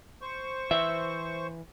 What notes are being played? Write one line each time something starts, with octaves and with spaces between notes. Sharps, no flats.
C5 C#6
E3 E5